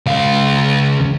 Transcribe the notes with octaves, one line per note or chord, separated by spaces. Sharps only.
C#2 F5